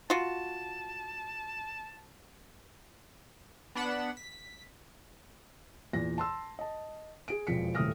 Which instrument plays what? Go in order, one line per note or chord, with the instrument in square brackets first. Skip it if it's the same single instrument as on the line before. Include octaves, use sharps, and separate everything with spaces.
[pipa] F4 F#4 [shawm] A5
[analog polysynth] B3 D4 F#5 B5 E7
B6
[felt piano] E2 A#2 A#6
A5 C6 E6
D#5 A5
G#4 D7
E1 F2 F3 B6 C#7
D#1 A2 A3 D#6 F6 A#6